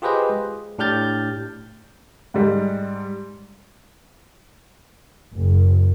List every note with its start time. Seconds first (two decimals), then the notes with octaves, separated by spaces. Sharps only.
0.02 F4 G4 G#4 B4 C5 D#5
0.30 G#3
0.79 A2 D4 G4 F6 G6 A6
2.34 G#2 G3
5.33 F#1